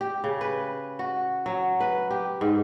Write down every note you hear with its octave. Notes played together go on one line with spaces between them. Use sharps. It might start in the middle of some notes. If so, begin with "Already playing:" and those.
G4
C#3
B4
F#4
F#3
B4
G4
G#2